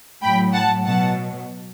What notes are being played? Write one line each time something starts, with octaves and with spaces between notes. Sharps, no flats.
A2 F#3 G5 B5
F#5 A5
B2 F#3 F#5 A5